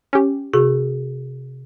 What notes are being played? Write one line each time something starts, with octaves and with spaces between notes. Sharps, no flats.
C#4 G4
C3 F#4 G#4